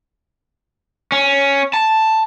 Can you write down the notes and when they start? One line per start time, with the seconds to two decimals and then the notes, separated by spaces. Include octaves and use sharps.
1.12 C#4
1.74 A5